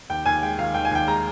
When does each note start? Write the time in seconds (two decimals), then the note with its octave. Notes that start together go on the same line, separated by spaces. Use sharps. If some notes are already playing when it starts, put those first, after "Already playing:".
0.10 D#2 G5
0.26 D#2 G#5
0.43 G#3 G5
0.58 D#3 F5
0.74 D#2 G5
0.85 G#5
0.91 D#2 G5
1.07 G#3 A#5